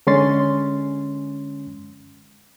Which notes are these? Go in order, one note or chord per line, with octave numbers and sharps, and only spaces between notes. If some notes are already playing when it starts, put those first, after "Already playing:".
D3 G#3 C#4 G#5 C6 A6